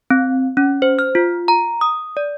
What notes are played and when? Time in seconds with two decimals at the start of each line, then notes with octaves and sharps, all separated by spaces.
0.10 C4
0.57 C#4
0.82 C5
0.99 F6
1.15 F4
1.48 A#5
1.81 D#6
2.17 D5